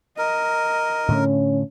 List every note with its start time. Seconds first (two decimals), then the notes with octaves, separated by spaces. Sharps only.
0.18 A#4 D#5
1.09 A2 D3 A3 C#4